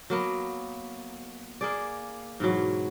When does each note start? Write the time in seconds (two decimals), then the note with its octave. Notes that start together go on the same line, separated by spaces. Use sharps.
0.10 F#3 A#3 B3
1.61 A#3 G#4 D5
2.40 G#2 B2 E3 F#3